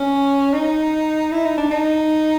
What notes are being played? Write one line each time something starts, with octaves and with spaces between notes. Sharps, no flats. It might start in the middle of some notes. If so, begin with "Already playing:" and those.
Already playing: C#4
D#4
E4
D#4
D4
D#4